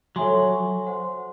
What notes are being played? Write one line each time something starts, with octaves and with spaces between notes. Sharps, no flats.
F#3 A4 C#5 E5 G#5 C6
C5 F#5 C6